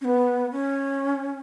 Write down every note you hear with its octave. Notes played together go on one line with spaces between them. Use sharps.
C#4
B3
C#4